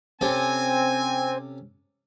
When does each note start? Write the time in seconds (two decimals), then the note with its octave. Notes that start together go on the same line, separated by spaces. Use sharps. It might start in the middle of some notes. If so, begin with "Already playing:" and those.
0.21 C3 C4 C#4 A4 G#5